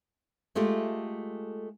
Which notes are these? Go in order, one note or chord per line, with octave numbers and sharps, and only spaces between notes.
G#3 A3 F4 G4 A4